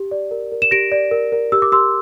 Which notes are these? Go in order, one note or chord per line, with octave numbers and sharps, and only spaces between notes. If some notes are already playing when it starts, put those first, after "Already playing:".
Already playing: G4
D5
A#4
A#4
E7
G4 A#6 D7
D5
A#4
A#4
G4 E6
D6
G4 C6 E6